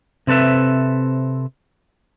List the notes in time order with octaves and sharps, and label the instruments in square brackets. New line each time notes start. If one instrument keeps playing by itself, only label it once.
[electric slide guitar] C3 C4 A4 B4 E5